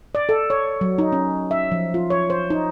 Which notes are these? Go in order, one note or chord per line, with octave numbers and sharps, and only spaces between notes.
D5
A4
C#5
F#3
D#4
C#4
E5
F3
F4
C#5
C5
D#4